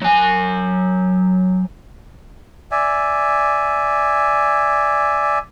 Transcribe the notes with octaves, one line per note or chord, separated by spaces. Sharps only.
F#3 G#5
D5 E5 G#5